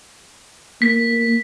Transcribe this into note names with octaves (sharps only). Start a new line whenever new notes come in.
A#3 B6